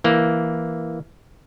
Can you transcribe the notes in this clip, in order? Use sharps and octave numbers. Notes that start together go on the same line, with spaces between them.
E3 A#3